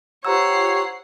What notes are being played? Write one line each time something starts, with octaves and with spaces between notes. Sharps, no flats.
F4 G4 C5 C#5 F#5 A#5 E6 C7